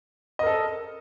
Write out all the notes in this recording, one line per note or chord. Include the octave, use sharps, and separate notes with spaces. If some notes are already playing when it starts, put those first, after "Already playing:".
A4 A#4 D#5